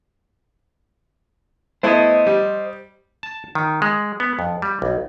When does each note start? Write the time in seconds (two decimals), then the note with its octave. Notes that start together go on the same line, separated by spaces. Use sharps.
1.83 A3 B3 E4 C5 D#5
2.26 G3
3.23 A5
3.55 D#3
3.82 G#3
4.20 B3
4.39 F2
4.62 G3
4.82 B1